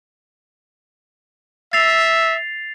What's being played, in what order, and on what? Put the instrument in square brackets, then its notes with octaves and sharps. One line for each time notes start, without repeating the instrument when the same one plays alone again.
[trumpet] E5 [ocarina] E6 [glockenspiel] A6 C7 F7